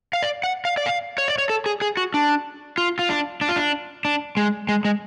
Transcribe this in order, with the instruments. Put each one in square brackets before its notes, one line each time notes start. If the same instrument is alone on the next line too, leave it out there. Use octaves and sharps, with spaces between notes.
[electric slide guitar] F5
D5
F#5
F5
D5
F5
C#5
D5
C#5
A4
G#4
G#4
F#4
D4
F4
F4
D4
D4
F4
D4
D4
G#3
G#3
G#3